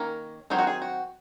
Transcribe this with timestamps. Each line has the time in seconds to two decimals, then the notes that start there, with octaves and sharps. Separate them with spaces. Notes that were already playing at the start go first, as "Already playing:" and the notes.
Already playing: D#3 A#3 C#4 A#4
0.50 D#3 F#3 C4 D#4 G#4
0.59 F#4
0.67 G#4
0.82 F#4